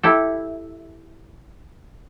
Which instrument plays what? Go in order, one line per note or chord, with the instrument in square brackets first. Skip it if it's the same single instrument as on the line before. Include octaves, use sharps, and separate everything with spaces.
[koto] E4 G4 A4